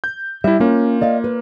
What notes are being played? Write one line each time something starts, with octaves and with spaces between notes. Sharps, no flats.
G6
G3 E4 E5
A#3 C#4 F4
D5 D#5 F5
B4